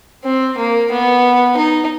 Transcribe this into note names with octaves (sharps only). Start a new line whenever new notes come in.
C4
A#3
B3
D#4